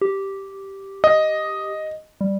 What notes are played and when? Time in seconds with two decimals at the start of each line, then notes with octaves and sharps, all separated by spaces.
0.01 G4
1.04 D#5
2.21 G3